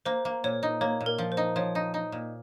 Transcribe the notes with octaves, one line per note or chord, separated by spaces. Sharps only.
A#3 C5
A#3
A#2 C#5
D#4
A#3 C#5
A#2
A#4
F3
C5
D#4
F3 C#5
D#4
D#4
A#2